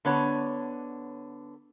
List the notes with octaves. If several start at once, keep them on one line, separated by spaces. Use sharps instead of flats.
D3 B3 C#5